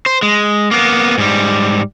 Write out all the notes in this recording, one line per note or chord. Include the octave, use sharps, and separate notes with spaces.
C5
G#3
A#3 B3
G#2 G3